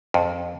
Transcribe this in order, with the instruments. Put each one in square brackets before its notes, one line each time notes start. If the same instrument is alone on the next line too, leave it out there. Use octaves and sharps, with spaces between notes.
[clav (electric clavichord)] F2